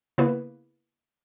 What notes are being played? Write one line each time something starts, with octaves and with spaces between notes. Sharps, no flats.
C#3 A#3 B3 E4 B4